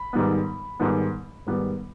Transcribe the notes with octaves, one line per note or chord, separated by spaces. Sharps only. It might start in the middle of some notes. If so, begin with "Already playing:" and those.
Already playing: B5
G#2 D#3 G3 B3
G#2 D#3 G3 B3
G#2 D#3 G3 B3